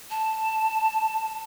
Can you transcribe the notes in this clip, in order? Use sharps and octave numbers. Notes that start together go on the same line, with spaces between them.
A5